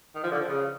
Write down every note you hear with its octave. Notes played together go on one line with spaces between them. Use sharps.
D#3
F3
D3
F3
C#3